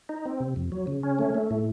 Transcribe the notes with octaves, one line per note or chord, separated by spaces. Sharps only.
D#4
C4
C3
F2
F#3
C#3
C#4
A3
A3
A2